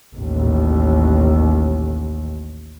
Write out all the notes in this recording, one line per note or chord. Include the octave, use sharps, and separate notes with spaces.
A1 D#2